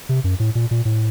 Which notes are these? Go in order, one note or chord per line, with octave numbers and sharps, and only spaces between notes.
C3
F#2
A2
A#2
A#2
A2